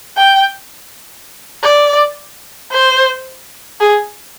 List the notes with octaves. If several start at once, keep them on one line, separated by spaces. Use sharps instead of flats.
G5
D5
C5
G#4